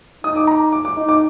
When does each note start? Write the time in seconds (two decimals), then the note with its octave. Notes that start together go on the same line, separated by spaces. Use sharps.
0.24 D#4 D#6
0.36 D6
0.47 A#5
0.72 D6
0.85 D6
0.97 D#4
1.09 D6